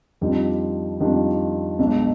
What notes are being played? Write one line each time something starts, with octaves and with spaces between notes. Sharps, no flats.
F2 D#3 G3 D4 F4
F2 D#3 G3 D4 F4
B1 B2 G#3 D4